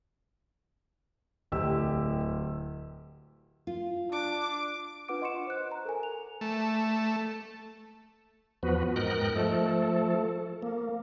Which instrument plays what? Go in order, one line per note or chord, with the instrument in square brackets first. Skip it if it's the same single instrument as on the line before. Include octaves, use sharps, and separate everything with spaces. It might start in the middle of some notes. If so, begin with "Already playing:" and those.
[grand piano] D1 G4 E6
[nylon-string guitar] F4
[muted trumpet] D4 [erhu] D6
[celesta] D4 F4 B4 F#5 D6 D7
D#5 F#5 C6 C#6 C#7 E7
C5 F#6
A#5
A4 A#4 G#5
F7
[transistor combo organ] A3
[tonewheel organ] E2 F3 B3 F#4 B4
G#2 A#4 D#5 G5 F#6
F3 A3 A4
A#3